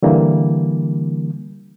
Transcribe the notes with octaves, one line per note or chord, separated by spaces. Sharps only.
D3 E3 G3 A#3